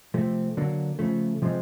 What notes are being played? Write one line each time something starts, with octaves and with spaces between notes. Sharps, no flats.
C3 F3 A3 C4
D3 F#3 A#3 D4
C#3 F3 A3
C3 F3 G#3 C4